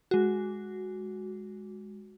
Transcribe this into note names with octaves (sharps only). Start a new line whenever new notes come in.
G#3 F#4